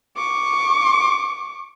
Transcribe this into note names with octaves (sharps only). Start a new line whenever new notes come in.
C#6 D6